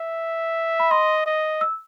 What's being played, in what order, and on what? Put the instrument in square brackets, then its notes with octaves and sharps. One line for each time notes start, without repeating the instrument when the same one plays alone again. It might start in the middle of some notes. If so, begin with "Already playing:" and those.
Already playing: [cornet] E5
[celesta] B5
[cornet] D#5 [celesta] C6
[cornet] D#5
[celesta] E6